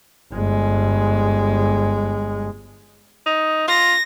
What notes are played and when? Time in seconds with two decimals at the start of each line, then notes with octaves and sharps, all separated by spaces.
0.32 G1 G#3
3.26 D#4
3.68 F4 A#6